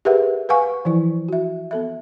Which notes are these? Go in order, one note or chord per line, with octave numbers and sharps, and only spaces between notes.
G4 G#4 A#4 B4 E5 F#5
B4 F5 F#5 G#5 C#6
E3 F3 E4
F#4 E5
B3 A4 E5